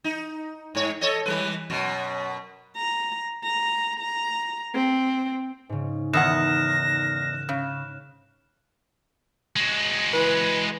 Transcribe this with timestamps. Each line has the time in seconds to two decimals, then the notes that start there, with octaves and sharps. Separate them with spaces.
0.04 D#4
0.75 G#2 C#5
1.01 A4 C#5 D#5
1.26 E3 G3 B4
1.70 F#2 B2
2.77 A#5
3.44 A#5
4.00 A#5
4.75 C4
5.69 G#2 C#3
6.13 E2 D#3 F#5 F6 F#6 A#6 E7
7.49 C#3
9.56 G#3 F#4
10.12 E3 B4